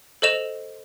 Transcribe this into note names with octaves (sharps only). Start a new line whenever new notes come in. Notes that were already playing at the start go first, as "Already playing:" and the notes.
A4 C5 D#5 E7 F7